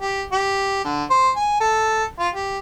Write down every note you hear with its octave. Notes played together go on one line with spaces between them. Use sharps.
G4
G4
D3
C5
G#5
A4
F4
G4